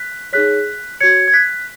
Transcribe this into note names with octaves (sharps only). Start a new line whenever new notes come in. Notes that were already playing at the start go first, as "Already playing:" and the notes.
Already playing: F#6 B6
D#4 G#4 C#5 F#6 B6
F#4 C#5 G#6 C#7
G#6
F#6 B6